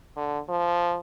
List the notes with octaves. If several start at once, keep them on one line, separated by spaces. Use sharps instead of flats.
D3
F3